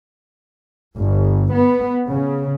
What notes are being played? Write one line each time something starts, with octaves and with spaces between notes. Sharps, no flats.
G1
B3
C#3